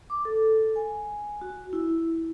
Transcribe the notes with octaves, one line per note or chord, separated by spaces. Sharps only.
D6
A4
G#5
F#4
E4